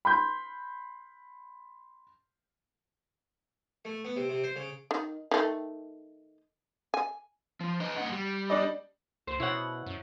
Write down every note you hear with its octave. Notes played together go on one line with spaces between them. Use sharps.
B5 C6 G6
A3
B3
C3
C3
C5
C#3
D#3
D#3 A3
G#5
F3
D4 B4 D#5
G2 A#3 F#5
G3
D4 D5 D#5
D2 C5
B2 E4 C#5 F#5
F#2